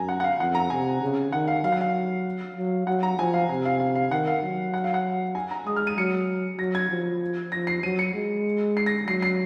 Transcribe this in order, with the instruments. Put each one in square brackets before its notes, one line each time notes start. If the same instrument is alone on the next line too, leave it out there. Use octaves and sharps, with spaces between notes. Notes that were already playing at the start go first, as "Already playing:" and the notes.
Already playing: [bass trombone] F#2 [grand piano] G#5 A#5
[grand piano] F#5
F#5
F5
[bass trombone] F2 [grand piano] F#5
[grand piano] A#5
[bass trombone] C3 [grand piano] G#5
[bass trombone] C#3
[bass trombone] D#3 [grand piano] F#5
[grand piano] F5
[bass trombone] F#3 [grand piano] F5
[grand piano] F#5
F5
[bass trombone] F#3
[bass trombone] F#3 [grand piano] F#5
[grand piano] A#5
[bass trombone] F3 [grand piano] G#5
[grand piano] F5
[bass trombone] C3 [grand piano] G#5
[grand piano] F5
F5
F5
[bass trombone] D#3 [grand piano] F#5
[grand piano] F5
[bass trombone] F#3
[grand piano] F#5
F5
F#5
G#5
A#5
[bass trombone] G#3 [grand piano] D#6
[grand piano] F6
D#7
[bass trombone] F#3 [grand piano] C#7
[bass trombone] F#3 [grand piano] A#6
[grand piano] G#6
[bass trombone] F3
[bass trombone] F3 [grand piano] A#6
[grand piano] C7
[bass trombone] F#3 [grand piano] D#7
[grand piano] C#7
[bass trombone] G#3
[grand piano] C7
A#6
[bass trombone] F#3 [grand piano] C7
[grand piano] C7